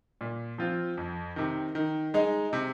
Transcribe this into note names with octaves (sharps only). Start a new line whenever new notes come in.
A#2
F3 C4 F4
F2
C3 D#3
D#3
G#3 D#4
C3